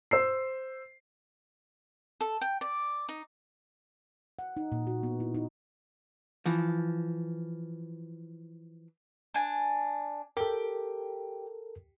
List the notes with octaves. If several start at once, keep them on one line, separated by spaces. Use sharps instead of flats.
C5 E6 C7
A4
G5
D5
D#4
F#5
D#4
A#2
F#4
B3
E4
D#4
E3 F3
D4 G#5
G4 A4 A#4